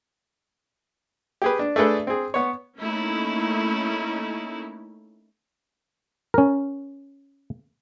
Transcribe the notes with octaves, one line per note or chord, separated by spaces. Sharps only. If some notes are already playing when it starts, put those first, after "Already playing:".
G4 G#4 B4
D4
A3 D4 G#4 A4 B4
C4 G#4
B3 C#5
A3 A#3 C#4 D#4 E4
C#4 A#4